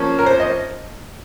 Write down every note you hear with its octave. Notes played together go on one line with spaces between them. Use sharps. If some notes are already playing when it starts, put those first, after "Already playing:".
Already playing: F3 A#3 C#4
A#4
C5
D#5